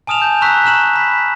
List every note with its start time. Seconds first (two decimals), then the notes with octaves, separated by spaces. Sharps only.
0.07 G#5 A5 D#6 F6 E7 F7
0.22 G#5 G6
0.42 A#5 C#6 E6 F#6 B6
0.64 A#5 C#6 F6 E7 F#7
0.95 B5 B6